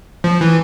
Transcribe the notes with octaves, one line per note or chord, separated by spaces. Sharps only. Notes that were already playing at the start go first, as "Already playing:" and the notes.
F3
E3